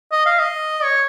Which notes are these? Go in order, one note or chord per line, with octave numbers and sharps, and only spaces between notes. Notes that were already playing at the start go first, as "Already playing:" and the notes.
D#5
F5
D#5
C#5